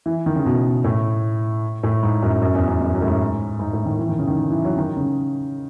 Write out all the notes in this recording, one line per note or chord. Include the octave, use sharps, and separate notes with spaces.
E3
D#3
C#3
B2
A2
A2
G#2
F#2
F#2
E2
F#2
E2
F#2
A2
G#2
G#2
A2
D#3
E3
D#3
C#3
D#3
D#3
E3
F#3
D#3
C#3